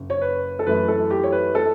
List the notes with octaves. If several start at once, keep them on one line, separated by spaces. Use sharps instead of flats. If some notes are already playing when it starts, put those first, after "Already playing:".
Already playing: F#1
C#5
B4
A4
F#2 E3 A3 E4 B4
A4
G4
C#5
B4
A4